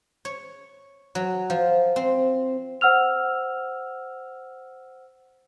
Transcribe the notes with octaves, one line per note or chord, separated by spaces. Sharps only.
C#5
F#3
F3
C4
C5 F#5 E6 F6 F7